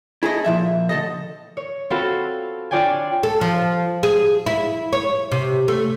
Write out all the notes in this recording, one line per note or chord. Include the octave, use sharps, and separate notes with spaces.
E4 G#4 A4 D#5
A#2 F3 E5
D2 A4 D#5
C#5
C4 F4 F#4 A4 F5 B5
D4 F4 C#5 D5 G5 G#5
A4
F3
G#4
E4
C#5
C3
A3